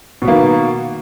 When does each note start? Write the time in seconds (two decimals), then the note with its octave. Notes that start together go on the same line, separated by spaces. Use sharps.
0.22 B2
0.25 B3
0.28 A#3
0.31 D#3